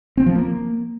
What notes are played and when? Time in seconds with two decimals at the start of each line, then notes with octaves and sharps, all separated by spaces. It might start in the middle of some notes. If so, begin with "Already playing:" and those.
0.17 C4
0.26 F3
0.35 A#3